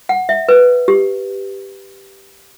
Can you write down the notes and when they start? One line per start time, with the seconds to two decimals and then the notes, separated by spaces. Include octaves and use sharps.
0.09 F#5
0.29 E5
0.49 B4
0.88 G4